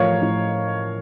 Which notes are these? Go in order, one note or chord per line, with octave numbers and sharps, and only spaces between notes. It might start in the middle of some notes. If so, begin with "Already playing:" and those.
Already playing: A2 F3 A3 A#4 C#5 F5
A2